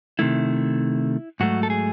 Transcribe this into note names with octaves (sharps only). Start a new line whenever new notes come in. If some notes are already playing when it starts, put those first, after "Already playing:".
C3 D#3 A3 E4
G#2 F#3 A3 F#4
A4
G#4